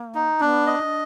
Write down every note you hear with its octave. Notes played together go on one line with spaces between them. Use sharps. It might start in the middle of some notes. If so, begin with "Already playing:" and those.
Already playing: A#3
D#4
B3 D4
D#5
D#4
D4